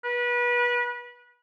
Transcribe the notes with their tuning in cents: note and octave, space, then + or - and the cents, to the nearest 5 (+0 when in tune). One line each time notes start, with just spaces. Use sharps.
B4 -30